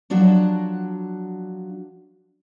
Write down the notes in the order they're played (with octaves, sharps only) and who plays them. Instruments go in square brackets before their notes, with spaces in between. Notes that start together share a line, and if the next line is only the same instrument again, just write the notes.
[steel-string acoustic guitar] F3 F#3 D4 F#4 A4